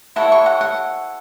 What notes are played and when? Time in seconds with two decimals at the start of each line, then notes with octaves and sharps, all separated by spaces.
0.16 E4 A4 C#5 F#5
0.32 C#6
0.46 F#5
0.61 F#5